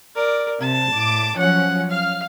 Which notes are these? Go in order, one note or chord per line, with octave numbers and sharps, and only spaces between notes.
A#4 D5
C3 A5
A2 D6
F3 F#3 C#4 F#5
F5 F6